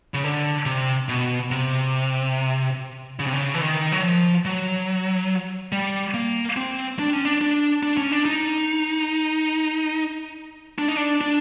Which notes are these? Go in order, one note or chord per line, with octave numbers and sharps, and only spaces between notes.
C#3
D3
C3
B2
C3
C#3
C3
C#3
E3
D#3
F#3
F3
F#3
G3
A#3
C4
D4
C#4
D4
D4
D4
C#4
D4
D#4
D4
D#4
D4
D4